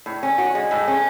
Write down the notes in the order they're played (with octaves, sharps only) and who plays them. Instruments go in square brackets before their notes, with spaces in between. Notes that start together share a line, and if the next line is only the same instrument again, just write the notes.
[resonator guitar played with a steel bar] A2
C#4
F#4
G#3
A2
C#4